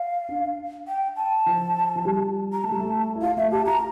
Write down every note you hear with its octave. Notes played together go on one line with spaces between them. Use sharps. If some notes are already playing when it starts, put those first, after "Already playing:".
Already playing: F5
D4
G5
A5
F3
F3
G3
A#5
A3 A5
G3
A3
E4
F4 F5
A3 E5
G4 A5
F4 A#5